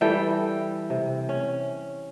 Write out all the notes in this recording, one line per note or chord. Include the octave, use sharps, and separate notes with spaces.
E3 G3 A4 G5
C3
C#4